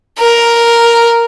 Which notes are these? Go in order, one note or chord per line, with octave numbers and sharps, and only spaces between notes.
A#4